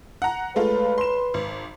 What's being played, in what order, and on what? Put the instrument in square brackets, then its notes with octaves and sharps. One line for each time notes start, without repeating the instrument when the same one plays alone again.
[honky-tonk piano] F#5 A#5
[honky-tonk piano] G#3 A3 F4 [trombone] B4
[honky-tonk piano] C6 E7
G#1